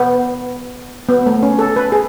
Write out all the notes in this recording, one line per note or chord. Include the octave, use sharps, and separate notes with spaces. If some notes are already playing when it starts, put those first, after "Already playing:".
Already playing: B3
B3
A3
C#4
A4
B4
G#4